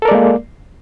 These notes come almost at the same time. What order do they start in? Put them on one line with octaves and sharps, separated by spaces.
A4 A#4 D5 G#3 A#3